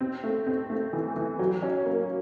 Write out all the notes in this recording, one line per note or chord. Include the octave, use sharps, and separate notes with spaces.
C4
A3
C4
A3
E3
E3
F#3
C#4
A#3